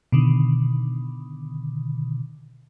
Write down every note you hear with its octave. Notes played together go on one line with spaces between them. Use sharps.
B2 D3 D#3